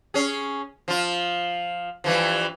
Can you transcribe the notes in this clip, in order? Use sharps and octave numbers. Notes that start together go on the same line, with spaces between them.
C#4 G#4
F3 F4
G2 E3 F3